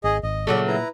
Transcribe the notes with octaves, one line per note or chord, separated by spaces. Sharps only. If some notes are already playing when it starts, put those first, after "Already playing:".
G#1 G#4 D#5
G#1 D#5
A#2 C#3 F#3 A3 D5 C#6
E4 B4 A#5